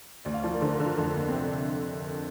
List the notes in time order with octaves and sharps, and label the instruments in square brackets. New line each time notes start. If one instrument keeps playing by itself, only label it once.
[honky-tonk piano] D2 [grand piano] D5
[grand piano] F5
[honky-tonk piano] F3 [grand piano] D5
[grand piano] A#4
[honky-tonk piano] D3 [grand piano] C5
[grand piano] A#4
[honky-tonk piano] D3
[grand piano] F4
[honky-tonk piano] F2 [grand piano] D4
[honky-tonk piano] A#3
[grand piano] C4
[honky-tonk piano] C3 [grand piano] D4